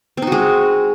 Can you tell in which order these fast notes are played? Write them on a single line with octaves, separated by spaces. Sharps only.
C4 D#4 F#4 G#3